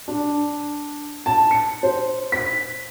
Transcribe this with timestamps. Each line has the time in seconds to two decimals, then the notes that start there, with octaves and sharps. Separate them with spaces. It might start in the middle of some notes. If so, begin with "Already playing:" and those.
0.08 D4
1.26 A5
1.51 C#7
1.83 C5
2.32 B6